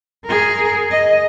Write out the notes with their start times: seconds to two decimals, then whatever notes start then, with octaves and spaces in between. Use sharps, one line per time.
0.24 G#4 A#4
0.91 D#5